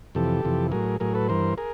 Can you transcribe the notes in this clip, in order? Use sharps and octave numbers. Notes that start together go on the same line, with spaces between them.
F2 C3 E3 G4 A4
F2 C3 E3
A2 F#3 G#4 A#4
A2 F#3 G#4 A#4
A4 B4
G2 E3 A#4 C5
G#4 A#4